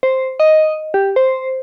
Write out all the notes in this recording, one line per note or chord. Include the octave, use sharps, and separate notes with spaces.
C5
D#5
G4
C5